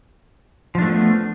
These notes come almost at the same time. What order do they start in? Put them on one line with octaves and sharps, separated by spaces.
F3 D4 A3 B3